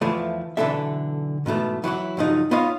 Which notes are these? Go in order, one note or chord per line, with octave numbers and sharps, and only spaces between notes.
E2 E3 F3 A3
B1 D3 E3 C4 A4 E5
G#2 B2 E3 A3
E3 F#3 E4 F#4
G2 C#3 F3 F#3 D#4
B3 D#4 F4 C#5 D#5 F5